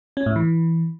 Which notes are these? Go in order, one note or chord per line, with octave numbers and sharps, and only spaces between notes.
C#4
A2
E3